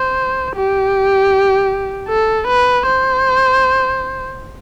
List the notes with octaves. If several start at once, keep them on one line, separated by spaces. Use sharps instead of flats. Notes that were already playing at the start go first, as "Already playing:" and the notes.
Already playing: C5
G4
A4
B4
C5